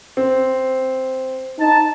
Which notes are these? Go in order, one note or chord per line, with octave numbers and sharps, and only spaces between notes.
C4
D#4 A5